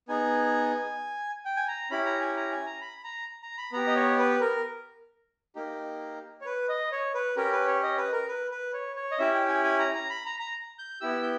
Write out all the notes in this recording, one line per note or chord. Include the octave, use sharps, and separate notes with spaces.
B3 D#4 G#4 G#5
G5
G#5
A#5
C#4 E4 G4 B5
A#5
G#5
A#5
G#5
A#5
B5
A#5
A#5
B5
B3 G4 A#5
D#5
C#5
B4
A#4
A#3 D#4 G4
C#5
B4
D#5
C#5
B4
C#4 G4 A#4
B4
C#5
D#5
B4
A#4
B4
B4
C#5
C#5
D#5
C#4 E4 G4 E5
G5
G#5
G#5
A#5
A#5
B5
A#5
A#5
G6
B3 E4 G4 E6
G6